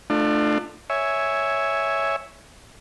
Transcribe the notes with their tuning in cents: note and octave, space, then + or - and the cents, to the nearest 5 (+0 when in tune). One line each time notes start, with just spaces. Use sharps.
A3 +0 D4 +35 F4 +0
C#5 +5 E5 +0 G#5 +0